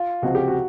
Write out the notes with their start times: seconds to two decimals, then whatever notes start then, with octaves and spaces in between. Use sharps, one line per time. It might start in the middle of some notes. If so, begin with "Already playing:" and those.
Already playing: F4
0.22 C#2 C3 F3 F#4
0.35 G4
0.48 F#4